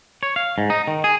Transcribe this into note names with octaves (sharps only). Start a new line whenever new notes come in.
C#5
F5
G#2
D#4
D#3
G#4